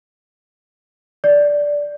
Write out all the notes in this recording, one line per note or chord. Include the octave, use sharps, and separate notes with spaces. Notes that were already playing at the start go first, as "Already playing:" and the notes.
D5